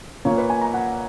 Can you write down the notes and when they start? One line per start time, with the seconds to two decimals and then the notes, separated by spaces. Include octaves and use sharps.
0.25 A#2 A#3 C#5
0.38 B4
0.50 G#5
0.61 A#5
0.74 F#5